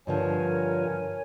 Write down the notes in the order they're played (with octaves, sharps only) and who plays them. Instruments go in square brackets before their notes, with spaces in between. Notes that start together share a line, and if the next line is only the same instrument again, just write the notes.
[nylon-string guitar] G2 D3 F3 [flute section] A#4 C#5 G#5